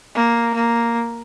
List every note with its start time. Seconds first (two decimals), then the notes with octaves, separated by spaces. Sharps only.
0.15 A#3
0.55 A#3